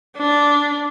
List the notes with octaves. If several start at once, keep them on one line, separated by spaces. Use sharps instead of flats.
D4